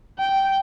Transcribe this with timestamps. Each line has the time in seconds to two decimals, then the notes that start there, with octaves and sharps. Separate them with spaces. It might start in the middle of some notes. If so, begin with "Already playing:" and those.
0.19 G5